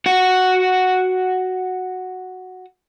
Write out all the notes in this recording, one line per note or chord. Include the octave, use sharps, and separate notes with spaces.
F#4 F#5